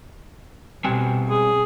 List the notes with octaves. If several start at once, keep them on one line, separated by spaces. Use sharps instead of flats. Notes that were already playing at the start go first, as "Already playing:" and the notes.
B2 G3 C4 G#5
G#4